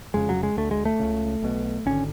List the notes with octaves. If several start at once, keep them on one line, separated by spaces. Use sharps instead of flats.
F1 F2 C#3 G#3
F#3
G#3
D2 D3 A3
G#3
A3
C#2 C#3
B1 B2
G#1 D3 C#4